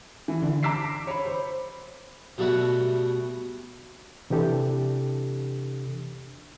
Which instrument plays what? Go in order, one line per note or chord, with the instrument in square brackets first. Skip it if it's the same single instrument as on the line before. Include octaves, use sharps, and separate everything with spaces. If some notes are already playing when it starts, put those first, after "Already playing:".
[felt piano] E3
D3
A#5 D6 E6 B6 C7
C#5 B5
C5
[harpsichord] B2 G3 A3 F#4 B4
[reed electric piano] C3 E3 D4 G4 A4